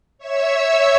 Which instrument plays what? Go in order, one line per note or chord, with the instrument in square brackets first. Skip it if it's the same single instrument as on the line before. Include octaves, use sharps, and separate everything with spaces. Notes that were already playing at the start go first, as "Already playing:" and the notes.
[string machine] C#5 E5 E6